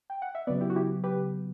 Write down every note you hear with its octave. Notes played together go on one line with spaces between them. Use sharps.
G5
F#5
E5
C#3 F#3 B3 B4 D5
E4 G4
F#4
E4 G4
G4 B4